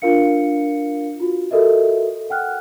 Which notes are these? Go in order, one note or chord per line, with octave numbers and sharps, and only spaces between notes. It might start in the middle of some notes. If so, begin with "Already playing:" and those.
D4 F4 A#4 F5 C#7
F4 F#4
F#4 G4 A4 A#4 D#5 E5
F#5 G5 F6 F#6